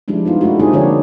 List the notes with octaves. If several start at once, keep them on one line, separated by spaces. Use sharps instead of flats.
F3 G3 G#3 D4 E4
B3 D#4 F4
G#3 A3 D4 E4 F#4
A#3 C4 D#4 G4 G#4
D3 F3 A#3 D4 G#4 C#5